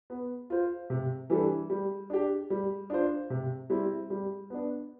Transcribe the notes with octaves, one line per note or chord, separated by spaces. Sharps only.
B3
F4 C5
C3
E3 G3 D4 A4
G3
D4 G4
G3
D4 F4 C5
C3
G3 C4 E4
G3
B3 D4